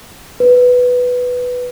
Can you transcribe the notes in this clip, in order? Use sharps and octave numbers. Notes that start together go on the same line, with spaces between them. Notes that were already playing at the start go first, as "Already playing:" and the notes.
B4